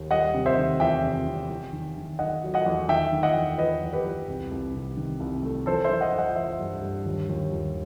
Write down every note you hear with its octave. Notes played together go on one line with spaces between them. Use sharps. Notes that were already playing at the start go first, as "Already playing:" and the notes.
Already playing: D#2
G3 D#5 F#5
C3
C5 E5
D#3
E2 E5 G5
C3
C3
E2
D#3
D#3
D#3 D#5 F#5
F#3
D#5 F#5
E2
D#3 E5 G5
D#3
D#5 F#5
E2
E2 B4 D#5
E2
G4 B4
E2
C2
C2
C3
D#3
C2
A3
E3 A4 C5
E3 C5 E5
D#5 F#5
E3
D#5 F#5
E3 C5 E5
G2
G2
D#2
D#2
D#2